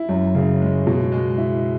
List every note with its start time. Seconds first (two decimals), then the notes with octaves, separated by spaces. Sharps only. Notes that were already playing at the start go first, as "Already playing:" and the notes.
Already playing: E4
0.09 F#2
0.35 C#3
0.61 G#3
0.87 B2
1.12 G#3
1.38 E4